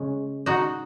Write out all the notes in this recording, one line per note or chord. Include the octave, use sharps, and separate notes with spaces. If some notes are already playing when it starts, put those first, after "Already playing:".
Already playing: C#3 G#3 C#4
D#4 F#4